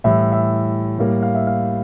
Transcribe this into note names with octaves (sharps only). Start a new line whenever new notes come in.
A2 E3 G3 E5
E5
A2 G3 A#3
F5
E5
F5